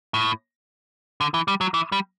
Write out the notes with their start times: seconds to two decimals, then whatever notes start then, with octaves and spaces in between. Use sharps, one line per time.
0.14 A2
1.21 D3
1.34 E3
1.48 G3
1.61 F#3
1.74 E3
1.92 G3